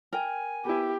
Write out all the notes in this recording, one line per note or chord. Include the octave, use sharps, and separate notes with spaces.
A#4 G5 G#5
B3 E4 G4